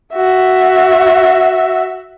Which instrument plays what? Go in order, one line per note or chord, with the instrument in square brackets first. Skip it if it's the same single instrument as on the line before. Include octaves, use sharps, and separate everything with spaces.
[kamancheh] F#4 E5